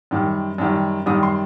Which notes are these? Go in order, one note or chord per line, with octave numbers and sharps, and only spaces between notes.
F#2 D#3 G3
F#2 D#3 G3
F#2 D#3 G3 D#6
C6